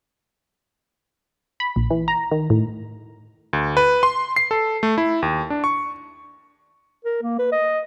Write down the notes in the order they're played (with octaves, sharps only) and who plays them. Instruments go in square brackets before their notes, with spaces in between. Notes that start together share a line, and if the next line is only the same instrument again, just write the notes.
[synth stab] B5
A#1
E3
A#5
D#3
A2
[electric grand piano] D2
B4
C6
C7
A4
A3
E4
D#2
D4
C#6
[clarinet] A#4
A#3
B4
D#5